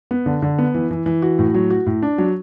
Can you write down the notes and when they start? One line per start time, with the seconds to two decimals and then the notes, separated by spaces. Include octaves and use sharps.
0.11 B3
0.26 D3
0.42 D3
0.58 B3
0.74 E3
0.91 E3
1.06 E3
1.22 F#4
1.39 A2
1.54 F#3
1.70 F#4
1.86 A2
2.03 D4
2.18 F#3